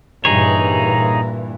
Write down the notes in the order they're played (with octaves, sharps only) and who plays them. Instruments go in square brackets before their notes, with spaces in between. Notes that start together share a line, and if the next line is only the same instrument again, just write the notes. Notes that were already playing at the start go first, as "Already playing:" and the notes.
[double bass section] G2 A#2 E3 [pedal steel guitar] D#4 G#4 C#5 [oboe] A#5